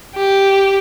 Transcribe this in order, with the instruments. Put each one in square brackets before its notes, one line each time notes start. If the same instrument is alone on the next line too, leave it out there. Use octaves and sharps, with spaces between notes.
[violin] G4